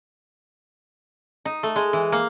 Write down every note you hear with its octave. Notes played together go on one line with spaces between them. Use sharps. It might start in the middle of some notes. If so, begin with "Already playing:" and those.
D#4
A3
G#3
E3
A#3